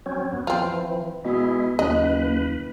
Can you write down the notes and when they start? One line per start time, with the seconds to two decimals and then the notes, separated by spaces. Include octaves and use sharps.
0.06 F#3 C4 C#4
0.33 F#2 B3
0.47 E3 F3 C4 F4
1.25 B2 G#3 E4
1.79 F#1 D#2 B4 D#5